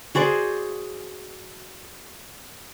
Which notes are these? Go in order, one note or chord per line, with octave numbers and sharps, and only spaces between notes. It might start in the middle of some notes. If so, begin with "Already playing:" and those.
F#4 G#4 C5 D5